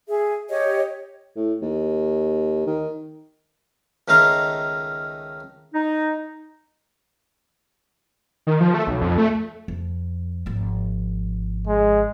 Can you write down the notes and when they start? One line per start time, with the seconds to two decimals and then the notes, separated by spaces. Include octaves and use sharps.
0.07 G#4 E5
0.49 G4 C#5 D#5
1.36 A2
1.62 D#2
2.67 D#3
4.08 C#2 D#3 A3 A#4 F5
5.73 D#4
8.47 D#3
8.60 F3
8.74 A3
8.87 B1
9.01 F2
9.18 A3
9.68 F2
10.46 G#1 F3
11.68 G#3